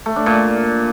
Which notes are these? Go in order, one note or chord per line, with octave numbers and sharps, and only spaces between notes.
A3
D4
A#2